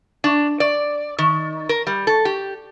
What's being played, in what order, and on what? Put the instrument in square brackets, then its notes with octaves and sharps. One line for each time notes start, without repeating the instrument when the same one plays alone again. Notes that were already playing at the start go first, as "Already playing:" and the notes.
[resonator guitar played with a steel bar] D4
D5
D#3
A#4
G3
A4
G4